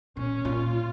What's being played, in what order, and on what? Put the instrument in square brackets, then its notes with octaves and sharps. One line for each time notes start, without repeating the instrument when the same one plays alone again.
[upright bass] A#2 [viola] C#4
[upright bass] A#2 [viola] F4